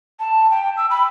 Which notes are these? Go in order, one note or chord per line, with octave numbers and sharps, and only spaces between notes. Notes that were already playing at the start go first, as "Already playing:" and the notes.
A5
G5
E6
B5